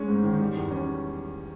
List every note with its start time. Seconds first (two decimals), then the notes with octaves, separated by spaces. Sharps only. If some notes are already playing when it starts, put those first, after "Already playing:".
Already playing: G#3 C#4
0.08 G#2
0.24 D#3
0.40 G3
0.55 E2
0.71 C#4